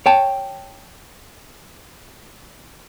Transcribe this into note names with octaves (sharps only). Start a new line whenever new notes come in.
C#5 G5 A5